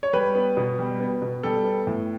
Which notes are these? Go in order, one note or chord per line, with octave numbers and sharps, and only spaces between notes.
C#5
G3 B4
B3
B2
G3
B3
B2
G3 A4
B3
A2